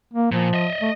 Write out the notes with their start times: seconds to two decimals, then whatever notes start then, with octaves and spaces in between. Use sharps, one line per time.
0.14 A#3
0.32 A#2 F3
0.54 D#5 E5
0.81 A3